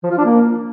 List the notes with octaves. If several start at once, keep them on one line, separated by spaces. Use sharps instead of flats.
F3
F4
D4
A#3